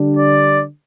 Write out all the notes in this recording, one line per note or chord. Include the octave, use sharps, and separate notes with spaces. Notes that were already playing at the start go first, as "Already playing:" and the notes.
Already playing: D3 G3 D4
D5